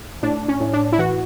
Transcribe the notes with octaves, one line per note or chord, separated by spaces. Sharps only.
A2 D4
C#4
A2
D4
E4
E3 F#4